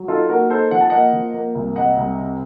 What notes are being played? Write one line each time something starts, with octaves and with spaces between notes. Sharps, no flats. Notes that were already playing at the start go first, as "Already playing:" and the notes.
Already playing: F#3
D#4 F4 A4
A#3 F#4 A#4
D#4 A4 C5
F3 F#5
A5
A#3 D#5 F#5
F3
A#3
C2
C2 D#5 F#5
C2
C3